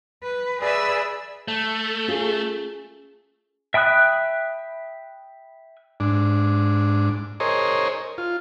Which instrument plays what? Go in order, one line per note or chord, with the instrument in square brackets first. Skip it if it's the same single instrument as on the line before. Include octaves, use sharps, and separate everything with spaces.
[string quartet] B4
G#4 B4 D5 E5 B5 E6
[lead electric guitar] A3
[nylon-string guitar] C#4 F4 G#4
[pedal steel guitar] E5 G5 B5 D#6 F#6
[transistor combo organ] G#2 D4
G#4 A#4 C5 C#5 D#5
F4